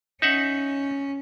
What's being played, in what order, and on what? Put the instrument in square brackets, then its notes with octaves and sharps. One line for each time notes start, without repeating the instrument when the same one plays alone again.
[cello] C#4 [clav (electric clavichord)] D#4 E5 F#5